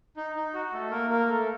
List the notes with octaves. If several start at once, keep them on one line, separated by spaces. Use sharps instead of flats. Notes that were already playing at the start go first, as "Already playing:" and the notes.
D#4
D#4
F#4
A3 A4
A#3 A#4
A#3 A#4
A3 A4